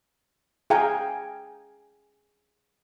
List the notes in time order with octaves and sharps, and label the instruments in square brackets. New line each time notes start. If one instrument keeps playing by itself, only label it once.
[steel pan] G#4 F5 G5 G#5 A#5